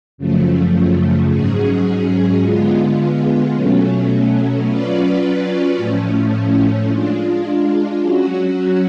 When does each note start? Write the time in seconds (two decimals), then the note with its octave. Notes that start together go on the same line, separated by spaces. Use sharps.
0.18 F#2 C#3 F3 A3
1.30 G#2 F#3 C#4 G#4
2.42 D3 G#3 B3 F4
3.53 B2 F#3 A3 C#4
4.66 F#3 C#4 F4 B4 D5
5.77 A2 F3 A3 C#4
6.89 G#3 D4 F4
8.01 F#3 C#4 F#4